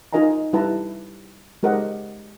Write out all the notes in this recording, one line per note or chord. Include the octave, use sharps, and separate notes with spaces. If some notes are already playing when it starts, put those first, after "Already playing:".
D#4 F4 A#4 D#5 G#5 A#5
G3 E4 B4 A5 A#5
G#3 G4 A#4 C5 D#5 F#5